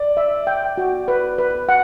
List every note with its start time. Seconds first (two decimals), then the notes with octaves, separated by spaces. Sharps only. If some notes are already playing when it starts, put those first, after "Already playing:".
Already playing: D5
0.17 E5
0.47 G5
0.78 F#4
1.08 B4
1.38 B4
1.69 F#5